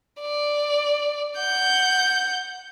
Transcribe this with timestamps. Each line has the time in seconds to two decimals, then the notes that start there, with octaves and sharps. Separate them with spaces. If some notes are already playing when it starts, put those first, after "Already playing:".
0.21 D5
1.38 F#5 G6